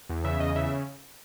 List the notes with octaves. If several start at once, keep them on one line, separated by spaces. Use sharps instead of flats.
E2
C#3 E5
E2 D#5
C#3 E5